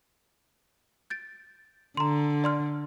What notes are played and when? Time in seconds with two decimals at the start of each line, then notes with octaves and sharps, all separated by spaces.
1.10 G6 A6 D7
1.97 D3 A#5 C6
2.44 D5 C6 F6